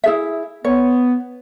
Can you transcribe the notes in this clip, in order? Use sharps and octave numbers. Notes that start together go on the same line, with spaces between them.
E4 G#4 E5
B3 C#5